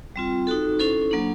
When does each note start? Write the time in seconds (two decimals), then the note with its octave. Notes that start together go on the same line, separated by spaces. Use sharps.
0.16 G3 C4 F4
0.47 D#4 F#4 A4
0.79 C#4 E4 A4 C5
1.11 F#3 A#3 D4